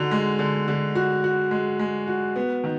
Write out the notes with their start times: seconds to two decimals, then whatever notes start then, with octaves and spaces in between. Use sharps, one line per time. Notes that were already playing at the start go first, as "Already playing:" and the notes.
Already playing: D3 D#4 F#4
0.11 G#3
0.39 D3
0.68 D3
0.95 F#4
1.24 F#4
1.51 G#3
1.79 G#3
2.08 F#4
2.36 B3
2.64 D#3